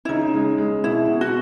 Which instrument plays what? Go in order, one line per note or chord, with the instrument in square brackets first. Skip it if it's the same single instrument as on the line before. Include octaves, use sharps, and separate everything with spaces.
[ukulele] E4
[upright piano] C#3 [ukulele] D#4
[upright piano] G#3
G#3
[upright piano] B2 [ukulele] E4
[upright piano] B2
[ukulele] F#4